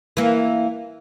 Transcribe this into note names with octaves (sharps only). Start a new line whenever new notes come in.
E3 A#3